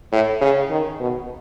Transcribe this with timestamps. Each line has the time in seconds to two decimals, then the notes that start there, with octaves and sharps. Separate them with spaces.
0.12 A2
0.41 C#3
0.70 D#3
1.00 B2